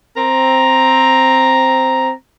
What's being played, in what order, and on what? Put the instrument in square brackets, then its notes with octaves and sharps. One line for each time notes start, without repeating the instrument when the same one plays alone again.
[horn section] C4 A#5